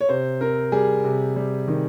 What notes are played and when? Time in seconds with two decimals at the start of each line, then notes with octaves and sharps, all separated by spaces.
0.01 C#5
0.09 C3 C5
0.41 C4 A#4
0.72 G3 G#4
1.04 C3
1.36 G3
1.68 D#3